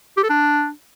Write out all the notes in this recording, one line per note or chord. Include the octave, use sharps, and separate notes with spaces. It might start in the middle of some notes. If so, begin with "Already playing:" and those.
G4
A4
D4